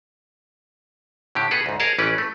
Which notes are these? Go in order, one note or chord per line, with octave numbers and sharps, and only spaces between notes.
A2 D3 G4
B2 G#4 A4 B4
D2 G#2
G#4 A#4 C#5 D#5 A5
A1 E3 C#4 B4 D5
A3